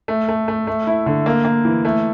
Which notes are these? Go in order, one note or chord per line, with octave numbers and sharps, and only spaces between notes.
A3
A3
A3
A3
E4
D3
A#3
A#3
E3
A3